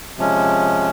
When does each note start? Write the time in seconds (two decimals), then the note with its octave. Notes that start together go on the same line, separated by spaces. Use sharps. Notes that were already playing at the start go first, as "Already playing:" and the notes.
0.18 C3 F3 G#3 C#4